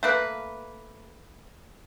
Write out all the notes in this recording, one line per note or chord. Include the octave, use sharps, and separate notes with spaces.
A3 A#3 B4